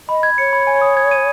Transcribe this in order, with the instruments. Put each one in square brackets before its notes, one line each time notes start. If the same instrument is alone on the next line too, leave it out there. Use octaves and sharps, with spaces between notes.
[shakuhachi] D#5 [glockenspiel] B5
[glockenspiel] G#6
[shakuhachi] C#5 [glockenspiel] C#7
[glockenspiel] B5
G#5
D#6
G#6
D#7